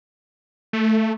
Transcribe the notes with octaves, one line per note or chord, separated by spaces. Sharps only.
A3